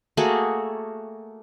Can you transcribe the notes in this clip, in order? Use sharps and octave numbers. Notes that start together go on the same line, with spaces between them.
A3 A#3 F#4 G#4